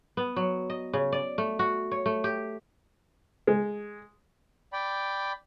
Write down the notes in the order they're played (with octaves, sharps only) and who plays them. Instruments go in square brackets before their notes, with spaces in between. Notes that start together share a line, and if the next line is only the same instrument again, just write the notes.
[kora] B3
F#3
D#5
C#3
D5
A3
F#4
C#5
A3
G4
[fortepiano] G#3
[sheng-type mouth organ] D5 G5 B5